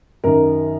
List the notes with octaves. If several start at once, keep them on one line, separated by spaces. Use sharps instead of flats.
F#2 D#3 A#4